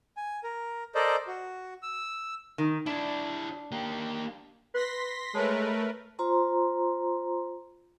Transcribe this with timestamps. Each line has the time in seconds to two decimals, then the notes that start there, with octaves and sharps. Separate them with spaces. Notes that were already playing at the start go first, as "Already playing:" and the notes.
0.17 G#5
0.44 A#4
0.95 A4 A#4 C5 D5 D#5
1.27 F#4
1.82 E6
2.58 D#3
2.86 D4 E4 D5
3.72 A#3 G4
4.74 B4 C6 A#6 B6
5.34 G#3 A3 A#4 B4 C#5 A5
6.19 F4 C5 A#5 C6